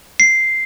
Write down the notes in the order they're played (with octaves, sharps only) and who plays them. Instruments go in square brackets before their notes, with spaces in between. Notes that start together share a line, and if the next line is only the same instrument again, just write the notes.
[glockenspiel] C7